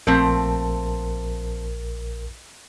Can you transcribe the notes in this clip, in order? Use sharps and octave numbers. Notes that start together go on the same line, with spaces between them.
A#1 F3 A3 C4 A#4